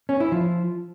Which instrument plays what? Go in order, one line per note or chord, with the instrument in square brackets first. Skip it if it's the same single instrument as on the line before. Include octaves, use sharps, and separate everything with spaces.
[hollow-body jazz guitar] C#4
E4
F3